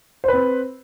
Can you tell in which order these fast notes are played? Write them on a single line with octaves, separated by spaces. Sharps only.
C5 B4 C4